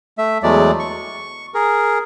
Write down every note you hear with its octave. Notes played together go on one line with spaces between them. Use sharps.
A3 E5
E2 F#3 G#3 A3 D5
C#6
G#4 A#4